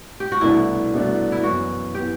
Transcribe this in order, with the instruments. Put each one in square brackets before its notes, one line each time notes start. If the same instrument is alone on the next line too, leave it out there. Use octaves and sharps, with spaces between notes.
[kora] G4
F#4
[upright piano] C2 B2 A3 D4 [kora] E4
[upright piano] C2 B2 A3 D4
[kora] E4
[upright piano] F#2 E3 B3 [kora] F#4
[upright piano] E3 B3 [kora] G4